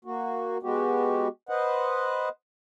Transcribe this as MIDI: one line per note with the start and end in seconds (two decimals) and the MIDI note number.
0.05 0.58 58
0.05 0.58 66
0.63 1.28 56
0.63 1.28 59
0.63 1.28 66
0.63 1.28 67
1.49 2.29 71
1.49 2.29 72
1.49 2.29 75
1.49 2.29 78